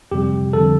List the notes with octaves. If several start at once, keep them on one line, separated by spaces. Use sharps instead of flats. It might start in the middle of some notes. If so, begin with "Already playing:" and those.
F2 C3 G3 G4
F2 D3 G3 A4